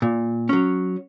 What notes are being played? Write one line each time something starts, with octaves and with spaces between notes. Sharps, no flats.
A#2
F#3 C#4